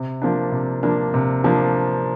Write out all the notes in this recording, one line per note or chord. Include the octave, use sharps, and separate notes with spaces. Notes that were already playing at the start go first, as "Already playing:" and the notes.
Already playing: C3
F3 A#3 D4
C3
F3 A#3 D4
C3
F3 A#3 D4